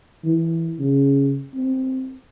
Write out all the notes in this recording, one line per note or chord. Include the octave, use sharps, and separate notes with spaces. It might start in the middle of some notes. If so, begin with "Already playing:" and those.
E3
C#3
C4